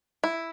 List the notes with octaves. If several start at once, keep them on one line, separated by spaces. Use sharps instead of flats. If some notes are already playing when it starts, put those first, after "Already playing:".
E4